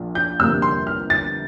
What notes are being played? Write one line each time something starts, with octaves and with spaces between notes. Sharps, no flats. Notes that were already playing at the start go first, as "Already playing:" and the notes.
Already playing: A#1 A#2
G6
G1 F2 C3 G3 A#3 E6
C6
F6
A6